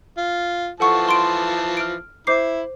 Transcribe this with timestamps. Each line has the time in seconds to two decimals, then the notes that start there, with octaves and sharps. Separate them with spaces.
0.17 F4
0.80 E3 F3 A4 F#5 A5 C#6
1.09 C6 D7
1.77 F6 D7
2.27 E4 C5 D6 C7